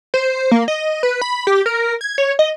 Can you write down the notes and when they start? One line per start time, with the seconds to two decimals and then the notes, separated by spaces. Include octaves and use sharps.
0.14 C5
0.51 A#3
0.68 D#5
1.03 B4
1.21 B5
1.47 G4
1.66 A#4
2.01 G#6
2.18 C#5
2.39 D#5